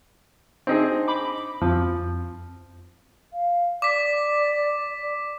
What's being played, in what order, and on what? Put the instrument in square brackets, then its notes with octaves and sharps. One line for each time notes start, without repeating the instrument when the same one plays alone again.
[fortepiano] C4 D#4 G#4 [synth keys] D4
[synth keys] B5 D6
[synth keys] F2 [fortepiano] F3
[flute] F5
[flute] D5 [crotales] D6 B6